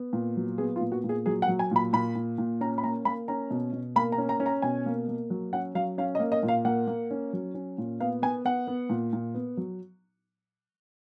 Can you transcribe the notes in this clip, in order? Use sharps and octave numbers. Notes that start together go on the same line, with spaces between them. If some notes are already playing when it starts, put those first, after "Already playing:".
Already playing: B3
A#2
F#3
B3 G#4
F4
A#2
F#4
A#2
G#4
F#3 G#4
F#5
F#3
G#5
A#2 B5
A#2 B5
A#2
A#2
C#4 A#5
B5
A#3 A#5
A#3 B5
C#4 A#5
B2
B2
A#3 B5
A#5
C#4
A#5
C#4
A#5
B2 G#5
A#3
A#3
F#3
C#4 F#5
F#3 F5
C#4 F5
D#5
A#3
D#5
A#2
F5
A#3 F#5
A#3
C#4
F#3
C#4
A#2
B3 F5
B3 G#5
B3 F#5
B3
A#2
A#2
B3
F#3